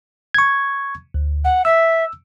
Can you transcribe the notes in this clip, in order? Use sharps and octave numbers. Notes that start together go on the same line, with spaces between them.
C#6 G#6
D2
F#5
E5 E6